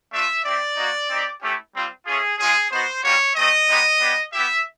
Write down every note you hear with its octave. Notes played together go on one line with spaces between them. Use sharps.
A3 D4 F4 E5
C4 E4 G4 D5
A#3 D#4 F#4
C4 D#4 G4
A3 C#4 E4 G4
G3 C4 F4
A3 C#4 F4 G#4
G#3 C#4 F4 G#4
B3 D#4 F#4 C5
G3 A#3 C#4 F#4 C#5
A3 C4 D#4 D#5
G#3 B3 D#4 G4
B3 D4 G4
B3 E4 G4 E5